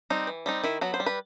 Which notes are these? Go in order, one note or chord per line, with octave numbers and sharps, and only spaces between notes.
G3 C4 D#4
E3
G3 C4 D#4
D#3 E4
F#3 B3 F#4
C5
G3
B4